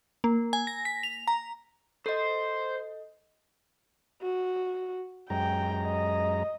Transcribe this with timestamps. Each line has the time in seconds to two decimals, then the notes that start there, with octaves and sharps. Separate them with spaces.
0.24 A#3
0.53 G#5
0.67 A#6
0.85 B6
1.03 F7
1.27 A#5
2.06 A4 C5 D#5
4.22 F#4
5.30 F#2 G#3 G5 A#5
5.86 D#5